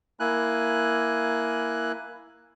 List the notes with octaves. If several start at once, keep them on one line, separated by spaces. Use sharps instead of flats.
A#3 E4 G#5 F#6